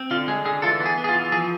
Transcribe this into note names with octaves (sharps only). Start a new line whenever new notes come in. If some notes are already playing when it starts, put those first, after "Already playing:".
Already playing: C4
D3 F4
G#3 G#4
D3 G#4
E3 F4 A4
B3
G#4
B3
G#4
F4
E3
F3 G#4